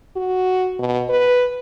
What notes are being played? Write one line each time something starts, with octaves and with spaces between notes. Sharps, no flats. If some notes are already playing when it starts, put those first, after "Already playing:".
F#4
B2
B4